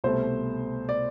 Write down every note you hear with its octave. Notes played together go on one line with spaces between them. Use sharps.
C2 B2 A3 C5
D5